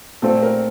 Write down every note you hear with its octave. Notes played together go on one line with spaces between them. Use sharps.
A#2 A3 C4 A4
A#4